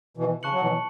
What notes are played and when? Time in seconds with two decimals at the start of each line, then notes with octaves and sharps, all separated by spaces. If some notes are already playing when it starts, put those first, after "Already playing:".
0.17 B2 E3
0.43 C#3 A5 C#6 F#6 C#7 F#7
0.52 F#3
0.62 B2 E3